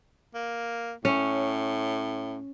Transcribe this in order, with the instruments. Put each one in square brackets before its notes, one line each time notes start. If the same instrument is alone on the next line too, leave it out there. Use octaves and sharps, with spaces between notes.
[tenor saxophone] A#3
[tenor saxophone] A2 [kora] C#4